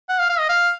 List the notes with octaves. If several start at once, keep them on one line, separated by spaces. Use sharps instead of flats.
F#5
F5
F5
D#5
F5